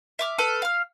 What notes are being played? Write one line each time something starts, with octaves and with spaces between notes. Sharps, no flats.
E5 D6 F6
A4 B4 F6
F5 F6